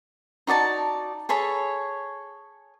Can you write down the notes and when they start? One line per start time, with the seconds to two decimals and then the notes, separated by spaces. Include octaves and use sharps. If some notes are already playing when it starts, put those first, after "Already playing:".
0.47 D#4 F#4 D5 A5
1.29 G#4 A4 C#5 B5